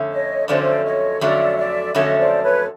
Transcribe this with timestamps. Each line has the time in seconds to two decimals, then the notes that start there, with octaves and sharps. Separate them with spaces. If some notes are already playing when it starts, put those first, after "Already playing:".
Already playing: F2 D3 A3 C#4
0.11 C#5 D#5
0.48 F2 D3 F#3 A3 C#4 C5 D5
0.84 C#5 D#5
1.21 F2 D3 F#3 A3 C#4 D5 E5
1.57 D5 E5
1.94 F2 D3 F#3 A3 C#4 C#5 D#5
2.18 C5 D5
2.42 B4 C#5